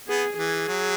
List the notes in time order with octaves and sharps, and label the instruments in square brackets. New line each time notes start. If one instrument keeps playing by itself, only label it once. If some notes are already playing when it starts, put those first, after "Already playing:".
[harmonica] B3 [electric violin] G#4
[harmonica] E3 [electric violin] G#4
[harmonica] F#3